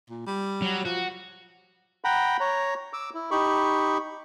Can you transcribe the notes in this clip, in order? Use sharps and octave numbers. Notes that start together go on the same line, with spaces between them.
A#2
G3
F#3
F3 F#4
F#5 G5 A#5 B5
C#5 A#5
D6 E6
E4
D#4 G4 B5 C#6